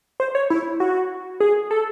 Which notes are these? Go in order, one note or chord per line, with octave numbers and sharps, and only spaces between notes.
C5
C#5
E4
F#4
G#4
A4